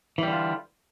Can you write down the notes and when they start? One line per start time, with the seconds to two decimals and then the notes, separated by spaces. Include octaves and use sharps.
0.18 E3
0.23 G3
0.28 D3
0.32 F4